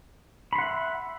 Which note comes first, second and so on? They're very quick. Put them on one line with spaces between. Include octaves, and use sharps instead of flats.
B5 C6 F#5 E5